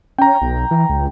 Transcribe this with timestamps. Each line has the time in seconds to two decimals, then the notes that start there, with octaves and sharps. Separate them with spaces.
0.18 C#4 G5 A#5
0.42 B1
0.71 E3
0.90 C#2